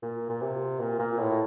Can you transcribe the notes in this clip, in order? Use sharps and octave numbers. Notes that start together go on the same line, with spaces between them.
A#2
A#2
C3
A#2
A#2
A2